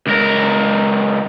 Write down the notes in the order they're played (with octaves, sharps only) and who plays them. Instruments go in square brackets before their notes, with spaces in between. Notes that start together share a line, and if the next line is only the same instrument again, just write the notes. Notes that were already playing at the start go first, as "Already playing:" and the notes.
[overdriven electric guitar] C#2 A#4